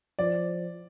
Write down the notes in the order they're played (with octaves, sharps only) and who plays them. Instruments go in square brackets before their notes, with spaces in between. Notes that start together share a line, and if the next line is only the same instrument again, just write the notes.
[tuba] F3 [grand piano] D5